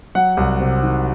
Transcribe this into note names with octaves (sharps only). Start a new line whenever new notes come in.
F#3 F#5
C2
C3
D#3